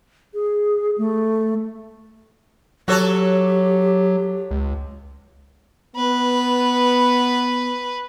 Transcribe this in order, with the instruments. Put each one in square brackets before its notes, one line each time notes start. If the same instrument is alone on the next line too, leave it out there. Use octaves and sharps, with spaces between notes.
[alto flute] G#4
A3
[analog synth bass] F#3 [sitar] F#4 A4 C#5 [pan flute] G4
[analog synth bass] C#2
[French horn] B3 [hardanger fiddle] B4